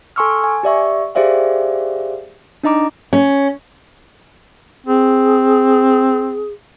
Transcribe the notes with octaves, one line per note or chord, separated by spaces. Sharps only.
A4 G#5 C6 C#6 E6 F6
G#5
G4 D5 E5 C#6
G4 G#4 C5 D5 E5 F5
D4 D#4 D#5 A#5 D6
C#4
C4 G#4